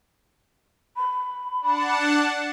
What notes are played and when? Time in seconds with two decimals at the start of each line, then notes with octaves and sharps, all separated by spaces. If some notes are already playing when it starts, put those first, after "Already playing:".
0.97 B5
1.61 D4 F#5 A5